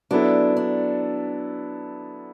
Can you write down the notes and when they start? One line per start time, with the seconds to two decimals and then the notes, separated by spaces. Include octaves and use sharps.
0.11 F#3 B3 D4 E4 A4
0.57 D4